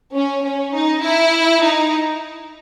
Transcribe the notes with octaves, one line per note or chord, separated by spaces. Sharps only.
C#4
C#4
D#4
E4
D#4